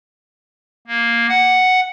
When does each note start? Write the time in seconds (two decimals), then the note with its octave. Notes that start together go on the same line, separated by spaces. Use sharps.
0.87 A#3
1.29 F#5